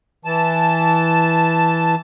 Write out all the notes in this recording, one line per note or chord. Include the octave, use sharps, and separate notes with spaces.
E3 A5